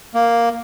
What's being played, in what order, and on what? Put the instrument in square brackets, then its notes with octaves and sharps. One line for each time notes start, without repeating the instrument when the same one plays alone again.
[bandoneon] A#3